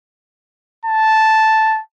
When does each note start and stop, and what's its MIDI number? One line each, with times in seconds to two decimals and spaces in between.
0.85 1.80 81